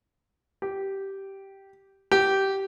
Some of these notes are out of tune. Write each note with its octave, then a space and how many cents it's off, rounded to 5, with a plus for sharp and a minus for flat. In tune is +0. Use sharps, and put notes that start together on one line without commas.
G4 -10
G4 -15